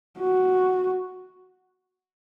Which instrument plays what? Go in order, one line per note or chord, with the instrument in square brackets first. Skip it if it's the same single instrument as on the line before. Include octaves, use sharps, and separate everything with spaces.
[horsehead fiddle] F#4